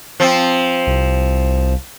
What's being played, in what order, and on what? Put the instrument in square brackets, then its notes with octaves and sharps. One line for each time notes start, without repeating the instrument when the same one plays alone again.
[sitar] F3 C4
[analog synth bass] C2